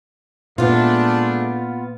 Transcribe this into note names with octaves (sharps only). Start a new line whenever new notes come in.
A#2 G#3 A3 B3 D4 F4